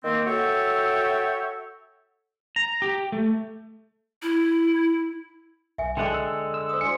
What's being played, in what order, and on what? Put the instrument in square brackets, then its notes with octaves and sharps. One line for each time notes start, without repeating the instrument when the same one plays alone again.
[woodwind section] D#3 A#3 C4
F#4 A4 C#5 E5 G5
[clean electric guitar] A#5
G4
A3
[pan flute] E4
[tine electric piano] B1 [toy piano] E5 G#5
[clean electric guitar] D3 G#3 F#5 [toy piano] G5 A5 D6
[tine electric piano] E6
E6
[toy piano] C5 D#6
[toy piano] F#4 D5 G#5 [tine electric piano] C#7